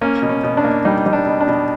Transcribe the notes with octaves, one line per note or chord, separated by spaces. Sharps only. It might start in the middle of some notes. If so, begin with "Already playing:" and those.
A#3 C#4
B2
C#4
B2
D4
A#3
G3 D#4
G3
D4
B2
D4
B2